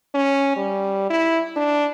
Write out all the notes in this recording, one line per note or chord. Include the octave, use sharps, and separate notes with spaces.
C#4
G3
E4
D4